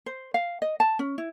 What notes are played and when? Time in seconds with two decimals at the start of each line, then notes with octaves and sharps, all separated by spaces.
0.06 C5
0.34 F5
0.62 D#5
0.80 A5
0.99 C#4
1.18 E4